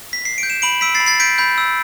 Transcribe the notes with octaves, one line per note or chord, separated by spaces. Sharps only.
B6
C7
D7
G6
E7
B5 D7 F#7
E6 B6 D7
A6 C7
B5
A6 C7
G6 B6 D7
B5 G6
E6